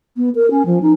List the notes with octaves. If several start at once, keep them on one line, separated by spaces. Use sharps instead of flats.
B3
A#4
C#4
F3
D#4